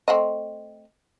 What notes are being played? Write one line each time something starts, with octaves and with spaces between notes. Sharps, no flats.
A3 C4 D#5